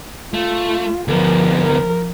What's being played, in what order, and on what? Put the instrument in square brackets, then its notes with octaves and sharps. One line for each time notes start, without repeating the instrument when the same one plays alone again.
[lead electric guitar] A3 [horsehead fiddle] F4
[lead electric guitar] D2 B3 [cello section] F3 [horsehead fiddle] A#4
[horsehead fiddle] A#4